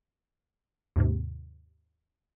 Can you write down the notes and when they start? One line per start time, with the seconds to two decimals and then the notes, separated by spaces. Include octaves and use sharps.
0.96 D#2 G#2 C3